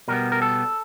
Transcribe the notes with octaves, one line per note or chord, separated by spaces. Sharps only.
B2 G3 B3 A#4
A#4
A4